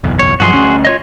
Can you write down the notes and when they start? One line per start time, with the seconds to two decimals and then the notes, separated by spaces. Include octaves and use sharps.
0.04 F#1 B1 E2
0.19 C#5
0.40 G2 F3 F#3 F#4 G#4 C6
0.52 D2 C#4
0.85 F4 C#5 D#5